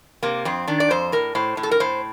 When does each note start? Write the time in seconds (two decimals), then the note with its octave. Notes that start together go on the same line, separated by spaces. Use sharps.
0.23 C3 A#3
0.45 F2 C4
0.67 D#3 D4
0.80 D5
0.90 F2 C5
1.12 A2 A#4
1.35 A2 C5
1.57 A2
1.63 A4
1.71 A#4
1.80 A2 C5